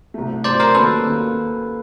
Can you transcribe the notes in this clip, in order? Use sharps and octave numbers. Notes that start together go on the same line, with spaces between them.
C2 B2 F#3 A3
C2 B2 F#3 A3 C5 D5
A#4 C5
D#2 D#3 F#3 A#3 C#4 A4 B4
D#2 D#3 F#3 A#3 C#4